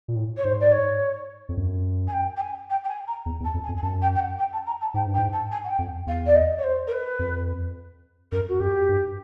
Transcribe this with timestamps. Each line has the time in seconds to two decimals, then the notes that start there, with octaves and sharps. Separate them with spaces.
0.08 A#2
0.16 A2
0.37 C#5
0.44 G#2 C5
0.60 D5
0.72 C#5
1.49 F2
1.57 F#2
2.07 G#5
2.12 G5
2.36 G5
2.41 G#5
2.69 G5
2.84 G5
2.88 G#5
3.07 A#5
3.26 E2
3.40 E2
3.44 A5
3.54 F2
3.63 G#5
3.68 F2
3.76 G#5
3.82 F#2 A5
4.01 G5
4.15 G5
4.19 F#5
4.38 G5
4.52 A5
4.66 A#5
4.81 A5
4.94 G#2 G5
5.07 G2
5.14 G5
5.18 G#2
5.32 A5
5.51 G#5
5.64 F#5
5.69 G5
5.78 F2
6.07 E2 F5
6.26 D5
6.35 D#5
6.58 C#5
6.63 C5
6.87 A#4
6.92 B4
7.19 F2
8.32 F#2 A#4
8.48 F#4
8.60 F#2 G4
8.89 G2